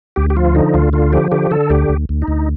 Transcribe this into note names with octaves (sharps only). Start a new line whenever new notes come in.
D2 G4
G4
F3 F4
D3 D#4
D2 F4
D3 F4
F3 G4
D3 G4
D3 A4
D2 G4
D2
D2
D#4
D2